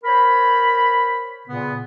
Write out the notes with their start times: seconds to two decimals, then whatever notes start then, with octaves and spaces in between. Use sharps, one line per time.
0.04 A#4 C5 C#5 B5
1.47 A#2 C#3 B3